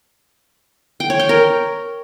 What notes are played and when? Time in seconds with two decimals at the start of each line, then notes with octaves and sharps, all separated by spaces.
1.00 G5
1.10 C#5
1.20 G5
1.29 A#4